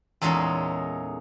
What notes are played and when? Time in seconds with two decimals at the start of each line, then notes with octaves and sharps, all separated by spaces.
0.22 E2 A#2 G#3 C#4 D#4 A4